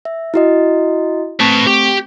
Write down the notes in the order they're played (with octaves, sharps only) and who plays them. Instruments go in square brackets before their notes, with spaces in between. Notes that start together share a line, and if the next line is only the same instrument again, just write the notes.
[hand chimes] E5
E4 F#4 D#5
[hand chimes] A3 C4 C#6 [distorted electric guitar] B4 A5
[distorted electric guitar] G4